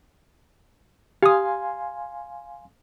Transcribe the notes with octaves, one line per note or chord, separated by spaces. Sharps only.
G4 F5 G#5 C6 D#6